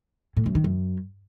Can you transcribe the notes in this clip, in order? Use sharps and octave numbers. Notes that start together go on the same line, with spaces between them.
A2
F#2
D#3
F#2